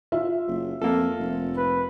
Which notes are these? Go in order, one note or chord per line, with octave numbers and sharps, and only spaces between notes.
F4 E5
F#1
F2 A#3 A4
F1
B4